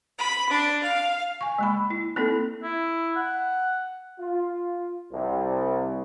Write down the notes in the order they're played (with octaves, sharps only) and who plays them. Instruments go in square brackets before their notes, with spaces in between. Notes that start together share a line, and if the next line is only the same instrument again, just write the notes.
[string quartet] B5
D4
F5
[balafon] G#5 C#6
G#3 A#3 B5
E4
A#3 C4 D#4 E4 A4
[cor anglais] E4
F#5
[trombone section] F4
C2